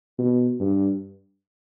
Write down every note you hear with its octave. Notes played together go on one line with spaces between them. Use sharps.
B2
G2